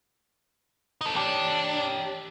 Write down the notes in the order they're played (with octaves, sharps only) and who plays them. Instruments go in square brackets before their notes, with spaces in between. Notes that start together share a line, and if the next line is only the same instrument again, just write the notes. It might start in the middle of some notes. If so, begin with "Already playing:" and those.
[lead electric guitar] D#4 A4
[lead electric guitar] D4 [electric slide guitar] G4 C#5 G5